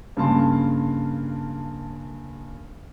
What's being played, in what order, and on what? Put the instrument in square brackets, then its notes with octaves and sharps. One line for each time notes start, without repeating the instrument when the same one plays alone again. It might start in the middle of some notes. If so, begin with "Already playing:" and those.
[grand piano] G2 C#3 A#3 A5 C6